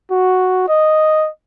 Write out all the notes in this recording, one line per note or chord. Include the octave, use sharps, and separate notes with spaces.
F#4
D#5